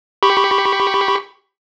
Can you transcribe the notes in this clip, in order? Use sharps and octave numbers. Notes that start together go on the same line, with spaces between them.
G4 B5 C#6